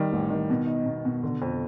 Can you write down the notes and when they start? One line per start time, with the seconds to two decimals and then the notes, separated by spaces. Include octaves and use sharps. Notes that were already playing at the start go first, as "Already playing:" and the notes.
Already playing: D#3 G3
0.13 A1
0.30 D#3
0.50 B2
0.67 D#4
0.86 B2
1.05 B2
1.23 D3
1.42 F2